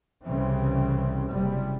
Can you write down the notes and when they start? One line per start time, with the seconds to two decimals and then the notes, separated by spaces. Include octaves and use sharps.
0.25 C2 C#3 E3 G3 C4
1.29 F#1 C3 G3